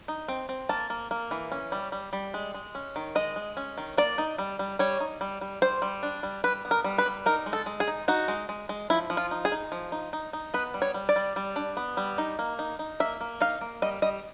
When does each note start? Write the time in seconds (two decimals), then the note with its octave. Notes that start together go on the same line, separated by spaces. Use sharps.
0.08 D#4
0.28 C4
0.49 C4
0.69 A#3 A5
0.90 A#3
1.11 A#3
1.31 E3
1.52 C#4
1.72 G3
1.92 G3
2.13 G3
2.34 G#3
2.54 G#3
2.75 C#4
2.96 D#3
3.15 G#3 D#5
3.36 G#3
3.57 C#4
3.78 D#3
3.97 A#3 D5
4.18 D#4
4.38 G3
4.59 G3
4.79 G3 C#5
5.00 D#4
5.21 G3
5.41 G3
5.62 G3 C5
5.82 G3
6.03 D4
6.23 G3
6.44 G3 B4
6.65 B3
6.71 A#4
6.84 G3
6.98 B4
7.06 G3
7.26 D#4 A#4
7.46 G#3
7.53 A4
7.66 G#3
7.80 G#4
7.88 D#4
8.08 D#4 F#4
8.28 G#3
8.49 G#3
8.69 G#3
8.90 F3 E4
9.10 F3
9.17 F4
9.31 D#4
9.45 G#4
9.52 D#4
9.72 F3
9.92 D#4
10.13 D#4
10.33 D#4
10.54 B3 B4
10.74 G3
10.82 C#5
10.94 G3
11.09 D5
11.16 G3
11.36 G3
11.56 D4
11.77 B3
11.97 G3
12.18 D#4
12.39 A#3
12.59 D#4
12.79 D#4
13.00 A#3 E5
13.21 A#3
13.41 D#4 F5
13.61 A#3
13.82 G3 D#5
14.02 G3 D#5